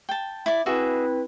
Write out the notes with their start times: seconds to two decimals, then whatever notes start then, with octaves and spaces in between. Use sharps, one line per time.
0.09 G5 A5
0.46 E4 D5
0.66 C4 E4 F#4 G#4 B4 E5